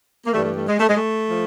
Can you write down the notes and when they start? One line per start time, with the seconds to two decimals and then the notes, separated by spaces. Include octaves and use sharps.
0.25 A#3
0.33 G2 E3 G3 A3
0.44 A3
0.56 A3
0.68 G#3
0.80 A3
0.88 G#3
0.96 A3
1.29 F3